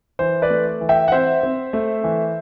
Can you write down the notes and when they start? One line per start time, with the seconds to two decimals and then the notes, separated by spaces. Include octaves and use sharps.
0.19 E3 C5
0.42 B4 D5
0.50 A3
0.81 E3
0.89 E5 G5
1.08 F#5
1.12 C4 C5 E5
1.43 C4
1.73 A3
2.04 E3